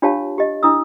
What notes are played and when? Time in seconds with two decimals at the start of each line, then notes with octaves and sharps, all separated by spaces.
0.02 D4 F4 G4 C#5 F5 A5
0.38 G4 D#5
0.63 D4 E4 D#6 E6